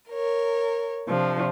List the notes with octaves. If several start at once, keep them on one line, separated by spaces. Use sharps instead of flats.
A#4 C#5
C3 F3 D4